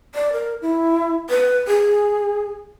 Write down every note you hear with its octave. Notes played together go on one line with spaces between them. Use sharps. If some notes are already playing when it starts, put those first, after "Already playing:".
D5
A#4
E4
B4
G#4